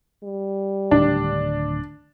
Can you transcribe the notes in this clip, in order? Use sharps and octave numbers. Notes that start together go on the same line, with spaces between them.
G3
D1 D#3 D4